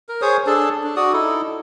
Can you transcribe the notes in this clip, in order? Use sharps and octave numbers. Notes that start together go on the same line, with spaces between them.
A#4
G#4 C5 C#5 D#6
D4 G#4 A4 A5
D4
F#4 D5 D#6
D#4 E4 A4